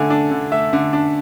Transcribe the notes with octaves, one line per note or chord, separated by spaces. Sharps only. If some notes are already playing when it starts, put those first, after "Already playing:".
Already playing: D3 A3 G#5
D4
D3
A3 E5
D3
D4